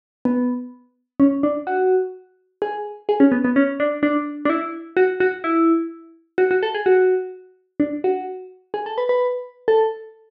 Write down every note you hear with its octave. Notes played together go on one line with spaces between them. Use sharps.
B3
C#4
D4
F#4
G#4
G#4
C#4
B3
B3
C#4
D4
D4
D4
E4
F#4
F#4
E4
F#4
F#4
A4
G#4
F#4
D4
F#4
G#4
A4
B4
B4
A4